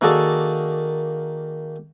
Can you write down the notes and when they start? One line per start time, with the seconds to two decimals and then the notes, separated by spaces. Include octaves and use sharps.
0.01 D#3 A#3 F#4 G#4 A4 D5